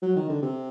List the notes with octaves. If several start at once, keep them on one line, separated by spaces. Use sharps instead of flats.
F#3
D#3
D3
C3